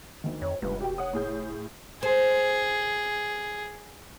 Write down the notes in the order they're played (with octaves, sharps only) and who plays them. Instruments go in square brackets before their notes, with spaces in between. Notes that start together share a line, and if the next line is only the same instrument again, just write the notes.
[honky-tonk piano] D2 D#3
[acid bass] F2 [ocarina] C#5
[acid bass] F1 [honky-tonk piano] C#2 G2 [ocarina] B4
[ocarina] F#4 [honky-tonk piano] G4 G5
[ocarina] C#5 [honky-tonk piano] F#5 D#6
[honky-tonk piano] A2 G#4 G6
[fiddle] G#4 [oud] C5